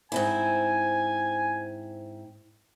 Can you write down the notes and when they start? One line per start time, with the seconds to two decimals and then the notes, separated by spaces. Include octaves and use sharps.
0.12 G#2 C4 E4 G#5